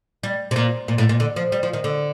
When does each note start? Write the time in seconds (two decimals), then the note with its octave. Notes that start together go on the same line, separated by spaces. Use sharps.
0.23 G3
0.51 C3
0.56 A#2
0.88 A#2
0.98 A2
1.09 A#2
1.20 D3
1.36 F3
1.52 G3
1.63 F3
1.73 D#3
1.84 D3